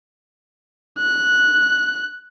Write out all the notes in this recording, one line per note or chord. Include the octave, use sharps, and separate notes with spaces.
F#6